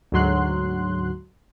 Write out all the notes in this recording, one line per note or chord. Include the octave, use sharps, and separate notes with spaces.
D2 G#2 F#3 C6 F#6